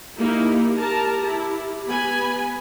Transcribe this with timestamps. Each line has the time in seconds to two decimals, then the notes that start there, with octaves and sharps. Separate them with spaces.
0.17 A#3 D#4 E4 G4
0.78 G4 A#4 A5 A#5
1.25 E4
1.88 B3 G#5 B5